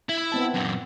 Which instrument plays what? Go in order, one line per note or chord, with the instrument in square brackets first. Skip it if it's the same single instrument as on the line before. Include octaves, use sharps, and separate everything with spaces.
[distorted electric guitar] E4 E5
[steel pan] B3 C4 A5
[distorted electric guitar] F#2 A#2